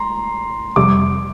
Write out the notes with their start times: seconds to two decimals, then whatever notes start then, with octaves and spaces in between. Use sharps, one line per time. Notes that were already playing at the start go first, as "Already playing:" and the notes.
Already playing: A#5 C6
0.76 F2 C3 G3 D6